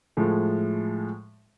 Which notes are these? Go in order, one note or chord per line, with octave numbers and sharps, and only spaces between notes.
A2 F3 G#3